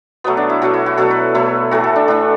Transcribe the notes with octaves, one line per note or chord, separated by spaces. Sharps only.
B2 F#3 A3 B3
D4
E4
B2 F#3 A3 F#4
E4
F#4
B2 F#3 A3 A4
B4
B2 F#3 A3 E4
A2 E3 A3 F#4
A4
D4
A2 E3 A3 D4